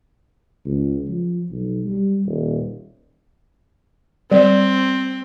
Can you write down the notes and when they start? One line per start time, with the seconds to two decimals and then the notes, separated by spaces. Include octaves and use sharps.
0.65 C#2
1.08 F3
1.50 B1
1.85 G3
2.26 D#1
4.31 G3 C4